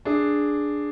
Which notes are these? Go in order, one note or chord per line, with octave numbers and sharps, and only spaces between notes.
D4 G#4